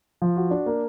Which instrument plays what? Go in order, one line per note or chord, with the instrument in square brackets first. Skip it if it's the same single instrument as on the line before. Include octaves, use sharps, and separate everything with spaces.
[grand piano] F3
F#4
D4
A#3